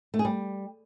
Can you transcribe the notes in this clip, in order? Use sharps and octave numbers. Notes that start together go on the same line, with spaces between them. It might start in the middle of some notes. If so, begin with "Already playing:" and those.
A3
G#4
G3